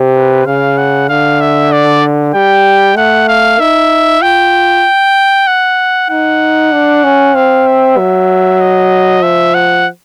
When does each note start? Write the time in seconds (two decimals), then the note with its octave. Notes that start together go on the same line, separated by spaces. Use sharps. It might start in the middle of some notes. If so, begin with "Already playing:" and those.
Already playing: C3
0.15 B4
0.46 C#3 F5
0.78 F#5
1.09 D3 F5
1.41 E5
1.72 D5
2.34 G3 G5
2.97 A3 F#5
3.28 F5
3.59 D#4 E5
4.22 F4 G5
5.47 F#5
6.10 D#4 F#5
6.72 D4
7.04 C#4
7.35 C4 F5
7.67 E5
7.97 F#3
8.61 D#5
9.23 F3 E5
9.54 F#5